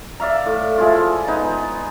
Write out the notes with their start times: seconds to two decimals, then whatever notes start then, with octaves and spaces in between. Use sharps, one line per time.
0.20 D5 E5 F5 A#5
0.46 A2
0.78 F3 G#3 E4 F4
1.28 B3 D#4 G#4